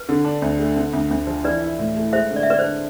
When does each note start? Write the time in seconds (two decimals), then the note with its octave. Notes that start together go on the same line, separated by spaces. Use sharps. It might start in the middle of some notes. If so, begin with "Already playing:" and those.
Already playing: B4
0.09 D3
0.25 D4
0.42 D2
0.59 A3
0.76 D3
0.93 D2
1.11 D2
1.27 F3
1.44 E3 B4 D5
1.62 E4
1.79 A2
1.96 A3
2.13 G#3 C5 E5
2.31 D3
2.36 D5
2.43 E5
2.47 D3 B4 D5
2.59 D4 C5